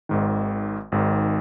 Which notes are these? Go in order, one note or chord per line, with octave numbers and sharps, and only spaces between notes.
G#1 G#2 D#3
G#1 G#2 D#3